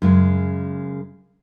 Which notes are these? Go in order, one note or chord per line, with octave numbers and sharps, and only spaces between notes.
F#2 C#3 G#3